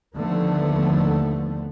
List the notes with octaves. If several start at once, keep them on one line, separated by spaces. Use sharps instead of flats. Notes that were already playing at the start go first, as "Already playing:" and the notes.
D#2 D3 F3 A3 B3